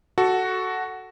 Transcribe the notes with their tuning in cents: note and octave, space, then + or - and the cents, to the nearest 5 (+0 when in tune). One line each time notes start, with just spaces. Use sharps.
F#4 +5 A4 +0